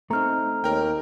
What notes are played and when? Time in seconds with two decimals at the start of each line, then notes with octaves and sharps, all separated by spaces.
0.11 A3 C4 D#4 A#5 F6
0.64 D#2 A#4 G5